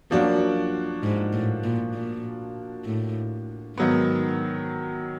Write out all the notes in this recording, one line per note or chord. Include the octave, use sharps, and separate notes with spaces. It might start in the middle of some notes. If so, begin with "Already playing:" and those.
F#2 F3 A#3 D4 F#4
G#2
A2
A#2
A#2
A2
G#2 D#3 F#3 B3